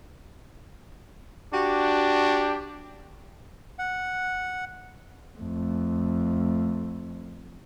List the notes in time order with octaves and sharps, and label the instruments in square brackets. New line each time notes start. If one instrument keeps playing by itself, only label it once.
[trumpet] D4 [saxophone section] F#4 G4
[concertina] F#5
[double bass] F2 A3